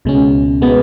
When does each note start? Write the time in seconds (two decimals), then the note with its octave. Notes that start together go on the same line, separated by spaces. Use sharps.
0.05 C#2 B2 G#3 C#4
0.62 B2 G#3 B3